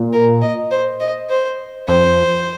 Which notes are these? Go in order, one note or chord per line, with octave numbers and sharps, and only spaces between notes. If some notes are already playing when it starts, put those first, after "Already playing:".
Already playing: A#2
A#4
D#5
C5
D#5
C5
F2 C5